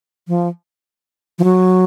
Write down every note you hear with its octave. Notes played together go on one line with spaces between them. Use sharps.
F3
F3
F#3